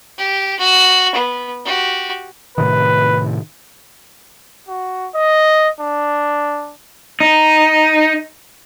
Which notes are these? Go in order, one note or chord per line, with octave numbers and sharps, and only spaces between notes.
G4
F#4
B3
F#4 G4
A2 C3 D#3 B4
F#4
D#5
D4
D#4